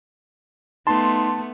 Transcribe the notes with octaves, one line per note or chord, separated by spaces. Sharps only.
A3 B3 D#4 A5 C6